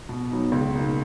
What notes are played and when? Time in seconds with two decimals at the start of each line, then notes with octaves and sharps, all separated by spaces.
0.09 B2
0.31 F#3 B3 D#4
0.52 C#2
0.74 B2 A#3 D#4